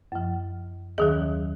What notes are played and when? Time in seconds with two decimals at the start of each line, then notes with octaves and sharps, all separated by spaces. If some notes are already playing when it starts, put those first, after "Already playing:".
0.12 F#2 F3
0.98 D#2 D#3 F#3 G#4